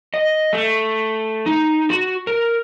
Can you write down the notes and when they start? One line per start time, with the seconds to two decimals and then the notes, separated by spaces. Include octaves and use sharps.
0.14 D#5
0.53 A3
1.46 D#4
1.90 F#4
2.27 A#4